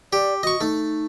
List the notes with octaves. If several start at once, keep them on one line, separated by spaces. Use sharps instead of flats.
G4 D5
F#4 D#5 C#6
A3 D#4